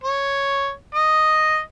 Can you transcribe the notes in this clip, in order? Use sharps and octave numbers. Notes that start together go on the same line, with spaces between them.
C#5
D#5